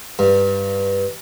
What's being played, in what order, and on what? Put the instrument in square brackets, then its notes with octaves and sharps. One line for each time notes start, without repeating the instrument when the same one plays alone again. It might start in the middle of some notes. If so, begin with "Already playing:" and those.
[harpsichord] G2